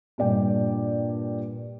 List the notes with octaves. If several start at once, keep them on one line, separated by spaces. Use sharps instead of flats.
G2 A#2 D5 G5